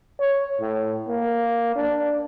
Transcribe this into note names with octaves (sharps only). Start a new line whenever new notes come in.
C#5
A2
A#3
D4